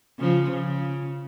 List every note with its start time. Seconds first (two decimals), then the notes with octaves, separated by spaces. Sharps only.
0.20 C#3 F3
0.51 C#3